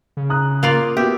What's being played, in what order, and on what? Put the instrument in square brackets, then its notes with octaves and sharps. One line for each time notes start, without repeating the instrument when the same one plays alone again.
[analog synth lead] C#3
[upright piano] A#5 D#6 F#6
[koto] A#3 F4 D5
[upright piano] B3 F#4 [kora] G4 [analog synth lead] E5